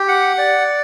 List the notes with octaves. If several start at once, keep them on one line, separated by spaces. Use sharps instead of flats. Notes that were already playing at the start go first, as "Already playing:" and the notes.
Already playing: G4
F#5
D5